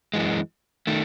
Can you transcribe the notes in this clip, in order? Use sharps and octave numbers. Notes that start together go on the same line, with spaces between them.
F#2 E3 G#3
D#3 A3